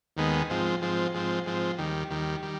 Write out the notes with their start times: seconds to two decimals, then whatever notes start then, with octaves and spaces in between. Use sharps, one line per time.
0.17 D#2 D#3 G#3 B3
0.50 G#2 F3 C4
0.82 G#2 F3 C4
1.14 G#2 F3 C4
1.46 G#2 F3 C4
1.78 D#2 D#3 G3
2.11 D#2 D#3 G3
2.43 D#3 G3